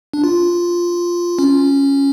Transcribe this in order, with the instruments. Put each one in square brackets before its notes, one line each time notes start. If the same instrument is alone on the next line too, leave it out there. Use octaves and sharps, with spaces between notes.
[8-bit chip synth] D4
F4
C#4